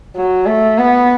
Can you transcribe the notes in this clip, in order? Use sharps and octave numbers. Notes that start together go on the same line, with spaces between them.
F#3
A3
B3